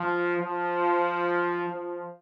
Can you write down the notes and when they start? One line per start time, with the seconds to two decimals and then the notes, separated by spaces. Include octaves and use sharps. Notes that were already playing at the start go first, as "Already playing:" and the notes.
Already playing: F3
0.39 F3
1.69 F3